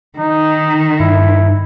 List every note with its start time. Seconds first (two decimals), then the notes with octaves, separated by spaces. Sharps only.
0.18 D#3 D#4
1.00 G2 E4